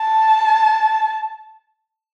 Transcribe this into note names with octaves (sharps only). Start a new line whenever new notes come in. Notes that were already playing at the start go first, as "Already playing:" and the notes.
Already playing: A5